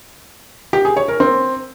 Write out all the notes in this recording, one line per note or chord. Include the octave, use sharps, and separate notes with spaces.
G4
G#4
C#5
A#4
C4